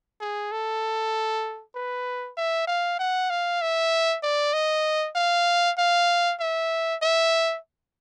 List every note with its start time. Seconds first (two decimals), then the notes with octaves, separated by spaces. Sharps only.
0.20 G#4
0.51 A4
1.75 B4
2.37 E5
2.67 F5
2.99 F#5
3.30 F5
3.61 E5
4.23 D5
4.53 D#5
5.15 F5
5.78 F5
6.40 E5
7.02 E5